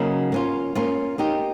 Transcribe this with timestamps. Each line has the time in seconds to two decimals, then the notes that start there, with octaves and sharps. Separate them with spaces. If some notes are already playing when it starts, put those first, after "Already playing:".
Already playing: C#3 F#3 A#3 D#4
0.32 A#3 C#4 F4
0.75 A#3 C#4 F4
1.18 A#3 D#4 G4